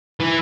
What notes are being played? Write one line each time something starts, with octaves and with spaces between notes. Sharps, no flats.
E3